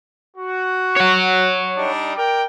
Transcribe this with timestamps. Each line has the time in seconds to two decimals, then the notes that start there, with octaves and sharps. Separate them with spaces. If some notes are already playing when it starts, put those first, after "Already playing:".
0.35 F#4
0.96 C#5 F#5
1.78 G3 D4 D#4
2.16 A#4 D5 G5